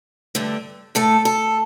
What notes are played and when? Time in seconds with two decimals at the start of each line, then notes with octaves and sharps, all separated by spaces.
0.35 G2 D3 A3
0.95 A2 A3 A4
1.25 A4